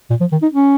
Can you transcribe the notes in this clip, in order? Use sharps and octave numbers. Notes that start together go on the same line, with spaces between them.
A#2
F3
D#3
D#4
C#4